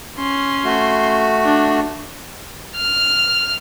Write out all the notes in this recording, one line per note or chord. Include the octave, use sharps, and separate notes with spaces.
C#4 C6
A3 F#4
D4
F6